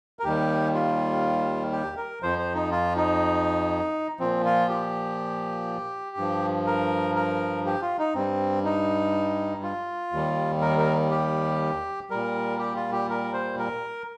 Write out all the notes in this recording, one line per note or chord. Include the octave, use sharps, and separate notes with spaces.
A#4
D#2 D#3 G3 G4
F4
G4
A#4
F2 F3 C5
C5
D#4
F4
D#4
A#2 F3 C4
F4
G4
G2 F3
A#4
A#4
G4
F4
D#4
G2 G3 C4
D#4
F4
D#2 D#3 G3
A#4
A#4
G4
A#2 G3 A#4
G4
F4
G4
A#4
C5
A#4